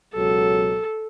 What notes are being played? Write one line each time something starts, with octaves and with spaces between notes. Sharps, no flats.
C#2 B2 F#3 A4